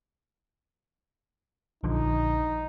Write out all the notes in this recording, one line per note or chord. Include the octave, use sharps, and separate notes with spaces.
A#1 D3 F3 D#4